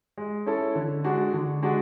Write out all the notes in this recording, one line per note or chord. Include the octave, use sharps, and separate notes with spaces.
G#3
C#4 E4 A4
D3
G#3 D4 F#4
D3
G#3 D4 F#4